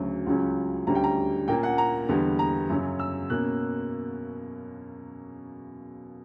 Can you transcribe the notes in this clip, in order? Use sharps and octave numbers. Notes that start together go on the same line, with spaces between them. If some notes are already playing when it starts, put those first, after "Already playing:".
Already playing: D2 C#3 F#3 C#4
C#2 C#3 F#3 C#4
D2 D3 G3 C#4 A#5
G5
A#5
A#2 A#3 C#4 G5
F#5
A#5
E2 D3 G3 B3
A#5
F#2 C#3 F#3 C#4
E6
B2 A#3 C#4 F#6